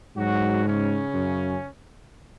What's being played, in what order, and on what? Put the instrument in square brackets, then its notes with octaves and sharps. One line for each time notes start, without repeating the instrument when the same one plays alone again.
[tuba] G#2 [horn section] F#3 F#4
[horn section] C#3 C#4
[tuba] F#2